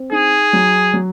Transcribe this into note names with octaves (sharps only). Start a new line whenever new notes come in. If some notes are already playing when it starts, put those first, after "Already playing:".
Already playing: C4
D#4 G#4
F#3
F#3